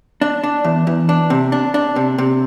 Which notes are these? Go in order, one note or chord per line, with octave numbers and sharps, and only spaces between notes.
D4
D4
E2
E2
D4
C3
D4
D4
C3
C3